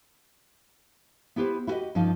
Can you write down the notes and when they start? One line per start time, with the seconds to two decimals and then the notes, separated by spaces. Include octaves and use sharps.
1.36 B3 E4 G4 B4 C5
1.67 E4 F#4 G4 A4 B4 D#5
1.95 G2 F3 C#4 D#4 F4